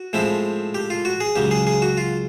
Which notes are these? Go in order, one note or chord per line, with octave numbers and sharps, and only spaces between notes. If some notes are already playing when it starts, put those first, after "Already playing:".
Already playing: F#4
A2 F3 G#3 C4 E4
G4
F4
F#4
G#4
C#2 C#3 F#3 G4
G#4
G#4
F#4
F4